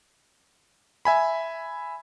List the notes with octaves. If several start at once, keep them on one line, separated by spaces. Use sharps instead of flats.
E5 G#5 B5